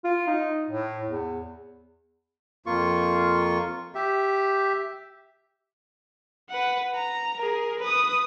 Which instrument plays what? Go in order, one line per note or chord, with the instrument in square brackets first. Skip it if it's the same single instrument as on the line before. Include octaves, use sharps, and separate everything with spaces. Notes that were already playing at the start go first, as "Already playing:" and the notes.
[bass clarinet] F4
D#4
A2
E2
[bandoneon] F2 A#3 F4 C#6
G4 E5
[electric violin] B4 F#5
A#5
G#4 A#4
B4 D#6